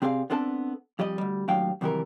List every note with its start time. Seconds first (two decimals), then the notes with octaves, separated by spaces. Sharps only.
0.02 C3 C4 G#4 D5 E5 F5
0.30 B3 C4 D4 A4 F5 A5
0.99 F2 G3 D5 D#5
1.18 D2 G3
1.48 D#2 A2 F#3 D4 F5 G5
1.81 F#2 C3 D#3 E3 G3 A#4